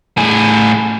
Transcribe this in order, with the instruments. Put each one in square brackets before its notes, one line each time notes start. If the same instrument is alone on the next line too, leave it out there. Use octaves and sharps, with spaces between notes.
[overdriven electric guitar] A2 G#4